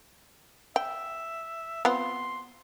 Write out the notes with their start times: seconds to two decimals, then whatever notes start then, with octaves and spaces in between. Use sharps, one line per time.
0.76 E5 G5
1.85 B3 C4 F4 C6